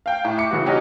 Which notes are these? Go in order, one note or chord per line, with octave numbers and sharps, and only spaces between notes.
F5 G5
A2
E5 D6 C#7
C#3 E3 F#4
C3 C#4 D#4 F#4 G4